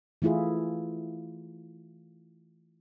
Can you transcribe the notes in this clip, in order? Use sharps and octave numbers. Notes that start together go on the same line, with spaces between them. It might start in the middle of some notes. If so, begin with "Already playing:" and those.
E3 A3 E4 F4 G#4